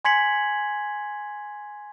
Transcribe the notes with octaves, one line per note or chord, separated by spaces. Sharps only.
G#5 C6 G#6 B6 C#7 F#7